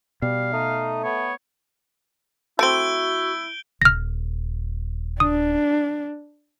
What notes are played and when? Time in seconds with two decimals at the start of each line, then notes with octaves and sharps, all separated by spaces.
0.22 B2 G3 F5
0.53 A3 D#4
1.04 B3 C#5
2.59 A3 C4 E4 F#4 G6 D7 G7
3.82 D#1 F6 A#6
5.20 D4 D#6